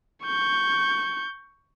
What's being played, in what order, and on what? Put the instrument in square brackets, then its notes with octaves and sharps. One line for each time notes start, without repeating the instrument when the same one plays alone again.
[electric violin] C#6 G6